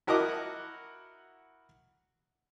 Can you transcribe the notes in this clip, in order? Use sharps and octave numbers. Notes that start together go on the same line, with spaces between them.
E4 F#4 A#4 D#5 F#5 D6